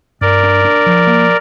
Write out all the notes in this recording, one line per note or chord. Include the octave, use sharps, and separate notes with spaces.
G2 A#4 D5
D4
D4
F3
A#3